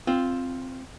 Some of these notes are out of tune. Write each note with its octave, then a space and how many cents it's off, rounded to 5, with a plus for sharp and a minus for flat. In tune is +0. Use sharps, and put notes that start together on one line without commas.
C4 +0 F4 +0